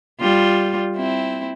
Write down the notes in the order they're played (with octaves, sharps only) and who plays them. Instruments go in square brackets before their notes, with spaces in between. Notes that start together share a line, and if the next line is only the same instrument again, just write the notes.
[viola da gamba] G3 F4
C4 E4